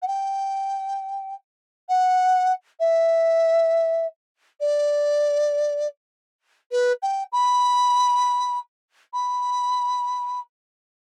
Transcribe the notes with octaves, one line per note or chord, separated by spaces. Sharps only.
F#5
G5
F#5
E5
D5
B4
G5
B5
B5